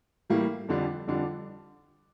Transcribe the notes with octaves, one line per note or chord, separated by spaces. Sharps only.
A2 E3 G3 A#3
F2 D3 G3 D4 F4
F2 D3 G3 D4 F4